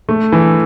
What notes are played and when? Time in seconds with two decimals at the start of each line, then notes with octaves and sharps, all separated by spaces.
0.09 A3
0.32 E3